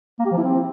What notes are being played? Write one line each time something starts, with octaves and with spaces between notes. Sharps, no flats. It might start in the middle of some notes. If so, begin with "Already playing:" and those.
A#3
G4
F3
E4
C4